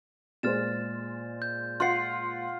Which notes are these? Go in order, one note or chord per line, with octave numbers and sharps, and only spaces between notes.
A#2 G#3 C5 F6 A6 E7
G6
F4 F#5 C6 C7